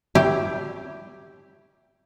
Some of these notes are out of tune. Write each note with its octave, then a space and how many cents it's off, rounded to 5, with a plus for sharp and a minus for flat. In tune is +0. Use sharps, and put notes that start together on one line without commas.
E4 +0 G4 +0